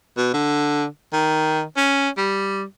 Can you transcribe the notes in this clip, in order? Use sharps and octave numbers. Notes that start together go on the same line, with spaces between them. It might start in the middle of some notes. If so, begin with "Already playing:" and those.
B2
D3
D#3
C#4
G3